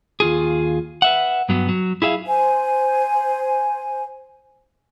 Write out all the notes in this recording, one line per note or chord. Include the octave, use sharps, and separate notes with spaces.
D#2 F4 G#4
B4 E5 F#5
G2 F#3 B3
F#3
E4 G#4 E5 F5
C5 G#5